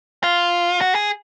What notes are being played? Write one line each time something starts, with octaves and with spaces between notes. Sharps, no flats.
F4
F#4
G#4